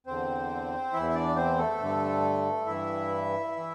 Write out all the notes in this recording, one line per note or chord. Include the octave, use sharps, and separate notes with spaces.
E2 D3 C4 C5
E2 E3 E4 E5
E5
D4 D5
C4 C5
A3 A4
G2 D3
G2 E3 E4 E5
E3